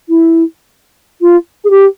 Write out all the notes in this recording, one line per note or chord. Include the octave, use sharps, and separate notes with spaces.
E4
F4
G#4
G4